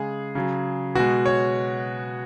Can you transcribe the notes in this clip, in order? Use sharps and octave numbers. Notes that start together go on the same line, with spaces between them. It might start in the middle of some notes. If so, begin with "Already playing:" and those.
Already playing: C#3 G#3 G#4
C#3 F#3
B2 G#3 F#4
C#5